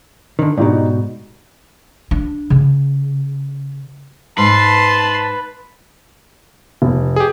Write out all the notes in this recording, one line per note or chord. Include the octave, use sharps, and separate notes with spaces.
D3 D#3
G#2 B2 D#4 G4 D5
D4
C#3
G#2 B4 A5 C6
F1
G4 G#4